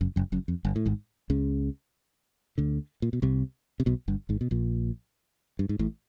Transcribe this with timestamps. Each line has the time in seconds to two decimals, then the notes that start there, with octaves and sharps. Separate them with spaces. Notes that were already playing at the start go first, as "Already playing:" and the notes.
0.01 F#1 F#2
0.16 F#1 F#2
0.32 F#1 F#2
0.48 F2
0.65 G1 G2
0.76 A2
0.86 G#1 G#2
1.30 C#2 C#3
2.58 D2 D3
3.02 A#2
3.13 B2
3.22 C2 C3
3.80 C3
3.86 B1 B2
4.08 G1 G2
4.29 G#1 G#2
4.41 B2
4.51 A#1 A#2
5.59 G2
5.69 G#2
5.79 A1 A2